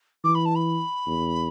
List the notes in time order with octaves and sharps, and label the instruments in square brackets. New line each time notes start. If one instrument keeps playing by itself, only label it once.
[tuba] E3 [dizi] D6
[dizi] B5
A5
B5
[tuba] E2